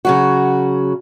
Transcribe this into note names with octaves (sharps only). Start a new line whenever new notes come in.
C#3 F#3 F#4